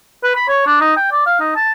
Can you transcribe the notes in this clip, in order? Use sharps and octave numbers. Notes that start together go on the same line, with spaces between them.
B4
B5
C#5
D4
D#4
G5
D5
F5
D#4
A5